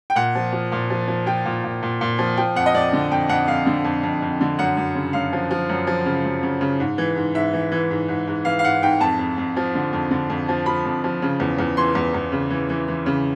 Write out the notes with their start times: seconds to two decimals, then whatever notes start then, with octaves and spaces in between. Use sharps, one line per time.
0.10 G5
0.16 A#2 F#5
0.35 F3
0.52 F3
0.72 A#2
0.90 F3
1.08 F3
1.26 F3 G5
1.46 A#2
1.64 A#2
1.83 A#2
2.01 A#2
2.19 F3
2.37 F3 G5
2.56 F2 F#5
2.66 D#5
2.74 F2 D5
2.93 D3
3.11 F2 G5
3.29 F2 F#5
3.48 F2 F5
3.66 D3
3.84 F2
4.03 F2
4.22 F2
4.41 D3
4.58 F#2 F#5
4.77 F#2
4.95 C#3
5.13 F#2 F5
5.33 F3
5.51 F3
5.69 F#2
5.87 F3
6.05 C#3
6.25 F#2
6.43 C#3
6.61 C#3
6.80 G#2
6.98 E3
7.16 G#2
7.35 G#2 E5
7.53 E3
7.72 E3
7.91 G#2
8.09 G#2
8.27 G#2
8.45 E3 F5
8.59 F5
8.64 G#2 F#5
8.82 G#2 G5
9.00 F2 A5
9.19 F2
9.38 F2
9.57 F3
9.75 D3
9.93 F2
10.11 D3
10.30 F2
10.49 F3
10.66 F3 B5
10.85 F2
11.04 F3
11.22 C#3
11.40 E2
11.58 E2
11.77 E3 C6
11.95 E2
12.14 E2
12.32 C#3
12.50 E3
12.69 E3
12.88 E3
13.06 C#3